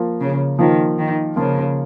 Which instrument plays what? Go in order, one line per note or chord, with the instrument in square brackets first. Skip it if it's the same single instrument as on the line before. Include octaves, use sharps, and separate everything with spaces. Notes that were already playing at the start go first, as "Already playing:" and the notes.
Already playing: [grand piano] F3 A#3 F4
[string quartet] C#3
[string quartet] D#3 [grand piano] F3 A#3 F4
[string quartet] D#3
[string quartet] C#3 [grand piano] F3 A#3 F4